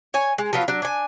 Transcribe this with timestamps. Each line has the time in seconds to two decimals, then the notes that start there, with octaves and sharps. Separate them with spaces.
0.14 C#5 G#5
0.38 G#3
0.53 F3 F#3 B3 F4
0.68 F#3 D4
0.82 D4 G#5